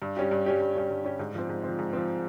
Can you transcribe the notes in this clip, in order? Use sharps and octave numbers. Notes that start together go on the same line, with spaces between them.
G2
G3 C#4 G4
G2
G3 C#4 G4
G2
G3 C#4 G4
G2
G3 C#4 G4
G#2
F3 C4
G#2
F3 C4
G#2
F3 C4